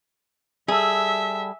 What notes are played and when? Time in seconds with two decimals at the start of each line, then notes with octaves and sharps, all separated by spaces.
0.68 G3 G#4 A4 E5